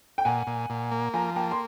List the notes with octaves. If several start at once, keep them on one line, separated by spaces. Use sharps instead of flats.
G5
A#2 F#5 G#5
A#2
A#2
A#3
F3 G#5 A#5
A#3 G5 A5
C6